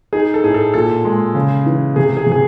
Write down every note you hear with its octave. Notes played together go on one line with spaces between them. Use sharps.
D#4 G#4
A4
A2 G#4
A4
A#2 A4
G#3
C#3
E3
C3 G#4
G#4
C3
G#4